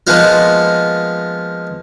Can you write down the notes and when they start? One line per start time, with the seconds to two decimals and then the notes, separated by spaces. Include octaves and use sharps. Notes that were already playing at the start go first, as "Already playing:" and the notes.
0.07 F3 G#3 A#3 B3 D#4 F4